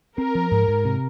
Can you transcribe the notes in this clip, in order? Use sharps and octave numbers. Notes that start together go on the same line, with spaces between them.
C4 A#4
F3
G#2
G#2
C3